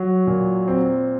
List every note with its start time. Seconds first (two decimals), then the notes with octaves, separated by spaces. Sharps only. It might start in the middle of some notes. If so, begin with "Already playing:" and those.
Already playing: F#3
0.27 A#2
0.68 C4